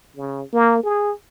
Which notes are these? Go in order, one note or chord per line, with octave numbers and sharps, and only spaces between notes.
C#3
A#3
G#4